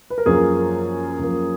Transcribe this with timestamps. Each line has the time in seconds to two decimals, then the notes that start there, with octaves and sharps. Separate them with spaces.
0.10 B4
0.18 A#4
0.26 F#2 F3 A#3 G#4
1.19 F#2 F3 A#3